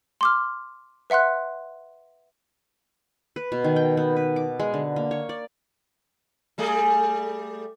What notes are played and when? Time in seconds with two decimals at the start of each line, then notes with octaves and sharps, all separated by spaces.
0.21 C6 D6 F6
1.10 B4 E5 F#5 C6 F#6
3.36 B4
3.52 B2
3.64 D#3
3.76 G5
3.97 B3
4.16 B4
4.36 D6
4.60 G#3
4.74 D3
4.96 A#3
5.11 C#5
5.29 D5
6.58 G3 A3 G#4